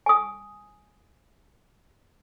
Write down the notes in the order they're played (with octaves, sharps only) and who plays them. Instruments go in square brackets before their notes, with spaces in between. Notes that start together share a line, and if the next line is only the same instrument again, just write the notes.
[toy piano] G#5 D#6